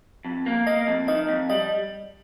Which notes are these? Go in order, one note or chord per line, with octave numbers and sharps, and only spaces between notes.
F2
A#3
A#3 D#5
F2
D#3 D#5
F2
G3 D#5